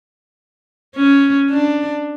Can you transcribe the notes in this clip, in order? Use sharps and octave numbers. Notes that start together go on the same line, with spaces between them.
C#4
D4